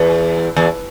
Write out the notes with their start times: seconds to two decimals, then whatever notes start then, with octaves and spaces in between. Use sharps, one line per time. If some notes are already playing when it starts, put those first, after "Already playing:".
Already playing: E2
0.56 E2